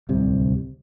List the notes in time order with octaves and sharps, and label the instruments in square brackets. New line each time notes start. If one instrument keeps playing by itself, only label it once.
[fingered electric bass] D1 C2 C3